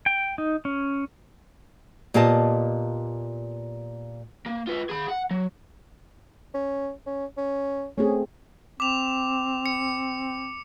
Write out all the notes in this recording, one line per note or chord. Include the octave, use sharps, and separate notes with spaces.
G5
D#4
C#4
A#2 B3 F4 G4 D#5 A5
A#3
F4 B4
G#4 B5
F#5
F#3
C#4
C#4
C#4
A3 C4 C#4 G#4
C4 D6 F7
C#7